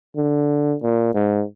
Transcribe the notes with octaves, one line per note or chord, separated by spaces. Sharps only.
D3
A#2
G#2